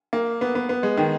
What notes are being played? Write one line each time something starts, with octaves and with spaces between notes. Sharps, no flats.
A#3
B3
B3
B3
G#3
D#3